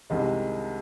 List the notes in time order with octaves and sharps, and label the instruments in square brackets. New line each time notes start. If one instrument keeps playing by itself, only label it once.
[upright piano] C2 C3 D#3 G#3